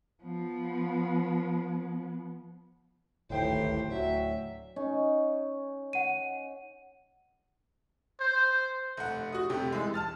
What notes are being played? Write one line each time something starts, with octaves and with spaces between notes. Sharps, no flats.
F3 B3
D1 G#1 C#2 A2 D#3 G4 C5 G5
D2 F#3 E5
C#4 D#4
F#5 D#7
C5
F1 F#5
F#4 D#6
F1 C3 G4
E3 G#3
A5 F6 A6